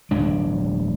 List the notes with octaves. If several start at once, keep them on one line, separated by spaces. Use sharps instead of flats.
D1 G#3 D4